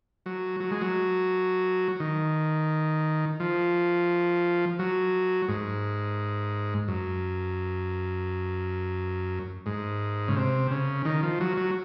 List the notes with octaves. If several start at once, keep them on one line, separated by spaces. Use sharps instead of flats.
F#3
F#3
G#3
F#3
D#3
F3
F#3
G#2
F#2
G#2
C#3
C3
C#3
D#3
F3
F#3
F#3